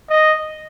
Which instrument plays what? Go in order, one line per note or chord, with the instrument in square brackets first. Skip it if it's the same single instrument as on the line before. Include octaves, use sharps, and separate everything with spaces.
[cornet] D#5